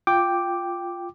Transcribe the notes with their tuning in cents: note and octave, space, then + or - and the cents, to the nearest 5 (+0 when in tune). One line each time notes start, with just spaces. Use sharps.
F4 +0 G5 +0 D6 +0